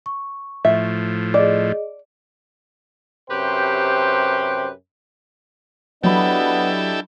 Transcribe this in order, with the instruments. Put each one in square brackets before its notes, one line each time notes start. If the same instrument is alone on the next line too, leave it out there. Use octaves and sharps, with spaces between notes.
[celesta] C#6
[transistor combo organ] A2 F3 [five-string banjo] E5
[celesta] G#4 D#5 [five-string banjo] D5
[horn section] F#2 C3 G4 B4 C5 G5
[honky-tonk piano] F#3 B5 [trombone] B3 [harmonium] D4 D#5 [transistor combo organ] E4 G4 A4